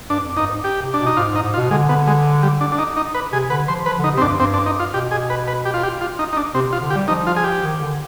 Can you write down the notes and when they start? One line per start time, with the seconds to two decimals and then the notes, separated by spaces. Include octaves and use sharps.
0.10 G2 D4
0.23 F2
0.37 G2 D#4
0.50 G#2
0.64 G4
0.81 C3
0.94 D4
1.00 B2
1.06 D#4
1.17 G#2 F4
1.31 G#2
1.35 D#4
1.44 G#2
1.54 F4
1.57 B2
1.71 D3 G#3
1.89 B3
2.07 G#3
2.42 G3
2.61 D4
2.72 D4
2.78 D#4
2.96 D#4
3.15 B4
3.32 C3 G#4
3.50 D3 B4
3.68 F3 C5
3.85 F3 B4
3.99 D3
4.04 D#4
4.14 C3 C4
4.21 F2 D4
4.27 G2
4.39 G2 C4
4.53 D4
4.66 D#4
4.80 F4
4.94 B2 G4
5.11 G#4
5.30 B4
5.48 B4
5.65 G4
5.74 F4
5.83 G4
6.01 F4
6.19 D#4
6.33 D#4
6.37 D4
6.55 C3 C4
6.68 C3
6.73 F4
6.81 D3
6.90 G4
6.95 G3
7.08 F3 D#4
7.27 F4
7.36 G#4
7.44 G4
7.63 D#3
7.81 D3